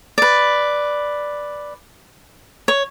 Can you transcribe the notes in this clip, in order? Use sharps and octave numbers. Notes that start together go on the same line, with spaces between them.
B4 D5
C#5